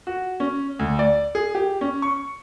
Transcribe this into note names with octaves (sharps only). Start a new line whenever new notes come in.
F#4
C#4
D2
D5
G#4
G4
C#4
C#6